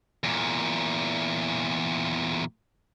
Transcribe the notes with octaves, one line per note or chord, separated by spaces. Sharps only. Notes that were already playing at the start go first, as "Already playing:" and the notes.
E2 A#2